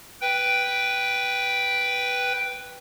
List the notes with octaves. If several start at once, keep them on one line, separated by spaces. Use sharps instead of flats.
B4 G5